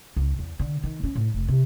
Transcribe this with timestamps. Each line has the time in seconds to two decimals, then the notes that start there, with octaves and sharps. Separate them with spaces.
0.16 C#2
0.39 E2
0.59 D3
0.83 D#3
1.04 C#4
1.15 A2
1.34 F1
1.48 C3